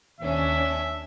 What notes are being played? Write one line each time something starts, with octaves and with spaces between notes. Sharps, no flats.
D#2 C#4 D4 E5